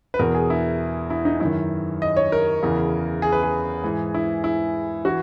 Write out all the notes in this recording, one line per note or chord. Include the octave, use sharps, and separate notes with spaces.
B4
E2 B2 A#4
G#4
E4
E4
D#4
F#2 D#3 E4
D#5
C#5
A#4
E2 C#3 E3
G#4
B4
G#4
G#2 E3
E4
E4
E3 F#4